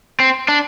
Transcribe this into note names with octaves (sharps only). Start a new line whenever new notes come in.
C4
D4